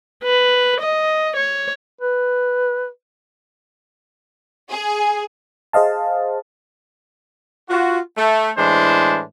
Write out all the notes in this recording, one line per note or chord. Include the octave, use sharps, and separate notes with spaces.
B4
D#5
C#5
B4
G#4
G#4 C5 D#5 F5 A5
F4 F#4
A3
A2 E3 G#3 D4 C5